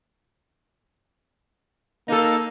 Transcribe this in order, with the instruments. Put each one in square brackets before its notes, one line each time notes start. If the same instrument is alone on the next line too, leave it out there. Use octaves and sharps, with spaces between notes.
[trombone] A#3 [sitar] D#4 A4